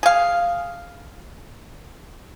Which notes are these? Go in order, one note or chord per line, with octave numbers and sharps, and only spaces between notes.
G#4 F5